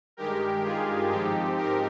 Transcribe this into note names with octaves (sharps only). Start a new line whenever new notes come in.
G2 D#3 G#3 G4 A#4
F4 G#4
G#2 F3 C4 D#4 G4
G4 A#4